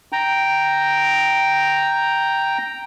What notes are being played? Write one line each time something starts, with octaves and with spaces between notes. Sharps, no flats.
G5 A#5